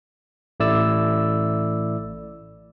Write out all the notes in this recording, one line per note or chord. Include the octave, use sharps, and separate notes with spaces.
A1 A3 E4 D5 E6